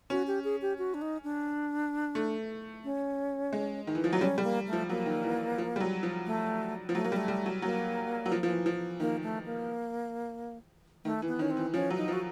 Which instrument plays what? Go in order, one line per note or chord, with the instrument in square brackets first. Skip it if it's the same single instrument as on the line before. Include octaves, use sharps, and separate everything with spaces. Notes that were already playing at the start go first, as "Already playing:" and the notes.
[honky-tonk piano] C#4 [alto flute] F#4
[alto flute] G4
G#4
G4
F#4
D4
D#4
D4
[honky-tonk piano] A3
[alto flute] C#4
[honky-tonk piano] G#3
D#3
E3
F3
F#3
[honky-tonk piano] G3 [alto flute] C#4
[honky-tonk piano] G3
[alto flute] A#3
A3
[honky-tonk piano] F3
[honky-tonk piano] F#3 [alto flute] A#3
[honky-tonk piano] D#3
E3
F3
G3
F#3
F3
[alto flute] A3
[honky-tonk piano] F3
[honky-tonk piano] F#3 [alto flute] A3
[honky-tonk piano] F#3 [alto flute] A#3
[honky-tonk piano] G3
[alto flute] A3
[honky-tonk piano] G3
F#3
[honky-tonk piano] F#3 [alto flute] A#3
[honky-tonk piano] F#3
F3
F3
E3
F3
[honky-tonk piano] D#3 [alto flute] A#3
[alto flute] A3
A#3
[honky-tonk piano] D#3 [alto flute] A3
[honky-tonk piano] E3
[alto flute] B3
[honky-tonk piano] D#3 [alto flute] C#4
[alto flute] C4
[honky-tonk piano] E3
[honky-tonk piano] F3 [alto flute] C#4
[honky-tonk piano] F#3
[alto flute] D#4
[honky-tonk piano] F3
[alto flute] F#4